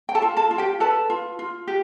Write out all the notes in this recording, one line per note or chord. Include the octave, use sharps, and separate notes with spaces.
G5
A4 A5
F4
A4 A5
F4
G4 G5
A4 B4 A5
F4
F4
G4